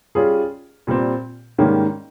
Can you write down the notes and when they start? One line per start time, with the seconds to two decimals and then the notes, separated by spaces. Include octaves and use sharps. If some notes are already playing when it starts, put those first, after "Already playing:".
0.15 G3 C#4 F4 G#4
0.87 A#2 G3 C4
1.58 G#2 D#3 G3 A#3 C#4